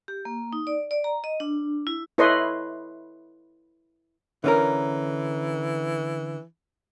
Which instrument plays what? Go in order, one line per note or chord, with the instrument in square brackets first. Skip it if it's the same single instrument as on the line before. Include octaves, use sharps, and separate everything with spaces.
[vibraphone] G4
A#3
D#4
D5
D5
A#5
D#5
D4
E4
[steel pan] E4 A4 B4 C#5 D#5 C6
[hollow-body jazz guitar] D3 C#4 A#4 [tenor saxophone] E3